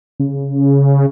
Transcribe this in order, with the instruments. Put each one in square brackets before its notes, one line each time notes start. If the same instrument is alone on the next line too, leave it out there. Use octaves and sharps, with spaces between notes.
[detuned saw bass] C#3